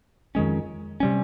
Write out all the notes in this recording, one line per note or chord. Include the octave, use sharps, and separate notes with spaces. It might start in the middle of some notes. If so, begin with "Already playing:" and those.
F2 D#3 G#3 C#4
C3 G3 C#4